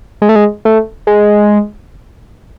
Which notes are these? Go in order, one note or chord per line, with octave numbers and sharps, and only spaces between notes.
G#3
A3
G#3
A3
G#3